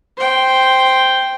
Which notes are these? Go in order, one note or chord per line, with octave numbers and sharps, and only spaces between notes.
C5 G5